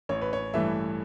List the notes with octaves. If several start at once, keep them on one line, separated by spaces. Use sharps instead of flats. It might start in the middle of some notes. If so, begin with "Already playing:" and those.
A1 C#5
B4
C#5
G2 E3 A3 E5